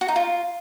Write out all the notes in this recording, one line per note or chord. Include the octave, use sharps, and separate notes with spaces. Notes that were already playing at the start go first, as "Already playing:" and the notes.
F#4
D#4
F4